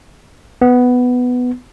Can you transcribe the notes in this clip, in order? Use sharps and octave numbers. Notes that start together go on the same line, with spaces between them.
B3